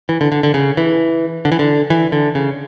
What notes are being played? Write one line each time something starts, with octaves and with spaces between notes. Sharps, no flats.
E3
D3
D3
D3
C#3
E3
D3
E3
D3
E3
D3
C#3